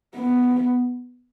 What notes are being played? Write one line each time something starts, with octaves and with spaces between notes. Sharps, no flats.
B3